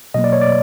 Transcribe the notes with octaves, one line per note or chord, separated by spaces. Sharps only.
B2 F#3 A#3 D#5
D5
C#5
D5